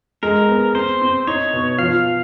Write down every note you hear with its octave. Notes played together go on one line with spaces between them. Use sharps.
G#3 A#4
B3
C4 C5
C4
D#4 C#5
B2
F3 F5